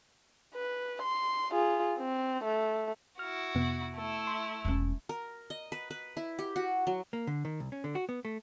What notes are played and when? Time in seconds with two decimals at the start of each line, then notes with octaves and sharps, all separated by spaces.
0.54 B4
1.03 C6
1.52 F4 G#4
1.99 C4
2.44 A3
3.19 E4 F#4 F6
3.55 F2 C3 B3
3.96 A3 E4
4.27 C6
4.65 E1 C#4
5.09 A#4
5.50 D#5
5.72 B4
5.91 B4
6.17 E4
6.39 G4
6.56 F#4
6.87 F#3
7.13 A#3
7.27 D3
7.45 D#3
7.60 C2
7.72 C#4
7.84 D3
7.95 F#4
8.09 B3
8.25 A3